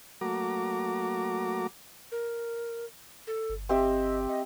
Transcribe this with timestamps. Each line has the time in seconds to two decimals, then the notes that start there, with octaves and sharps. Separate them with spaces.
0.21 F#3 A3 A#3 F#4 A#5 D6
2.12 A#4
3.27 A4
3.49 G1
3.69 C4 G4 D#5 E5
4.28 D#5